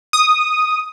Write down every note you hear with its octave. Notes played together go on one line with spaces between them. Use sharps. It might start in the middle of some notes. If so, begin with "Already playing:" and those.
D#6